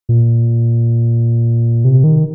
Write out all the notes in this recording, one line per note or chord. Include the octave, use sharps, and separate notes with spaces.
A#2
C3
D#3